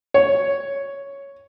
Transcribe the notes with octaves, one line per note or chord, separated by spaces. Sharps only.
C#5